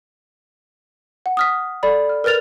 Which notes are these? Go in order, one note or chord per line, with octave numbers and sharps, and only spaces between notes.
F#5
D#6 F6 B6
A4 D5 B5
F6
A#4 B4 F6 A6 F7